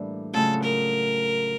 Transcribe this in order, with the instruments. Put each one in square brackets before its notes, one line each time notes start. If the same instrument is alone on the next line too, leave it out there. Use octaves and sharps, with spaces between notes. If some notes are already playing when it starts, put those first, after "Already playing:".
Already playing: [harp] A2 E3 G3 A#3 D4
[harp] C#3 F#3 A3 C#4 F4 [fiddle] A4
[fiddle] A#4